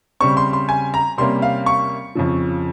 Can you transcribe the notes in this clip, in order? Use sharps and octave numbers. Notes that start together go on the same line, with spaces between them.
C#3 G3 C4 C#6
C6
C6
G#5
A#5
C3 G3 A#3 C#4 C6
F5
C#6
F2 C#3 F3